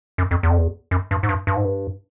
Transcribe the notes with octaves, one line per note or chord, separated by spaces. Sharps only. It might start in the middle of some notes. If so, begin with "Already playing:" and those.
F#2
F2
E2
F2
E2
F#2
G2
G#2
G2
G2
G#2
G2